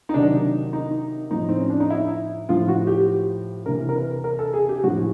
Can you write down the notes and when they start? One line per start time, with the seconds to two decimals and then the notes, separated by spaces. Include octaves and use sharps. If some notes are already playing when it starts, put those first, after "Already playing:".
0.09 D#4
0.14 C3 D#3 F#3 D4
0.73 D#4
1.31 A2 F3 D#4
1.49 C4
1.59 C#4
1.70 D4
1.80 D#4
1.90 E4
2.49 A2 F3 F4
2.68 F#4
2.87 G4
3.66 C3 E3 A#4
3.89 A#4
3.96 B4
4.24 A#4
4.39 A4
4.53 G#4
4.69 G4
4.84 A2 F3 F#4